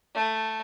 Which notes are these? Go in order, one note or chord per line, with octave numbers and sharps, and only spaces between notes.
A3